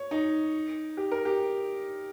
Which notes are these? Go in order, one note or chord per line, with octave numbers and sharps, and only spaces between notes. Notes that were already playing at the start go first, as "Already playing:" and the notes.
Already playing: C#5
D#4
G4
A#4
G4